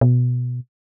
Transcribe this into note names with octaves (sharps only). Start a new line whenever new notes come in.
B2